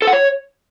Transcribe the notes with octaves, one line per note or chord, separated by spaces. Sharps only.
A4
F#5
C#5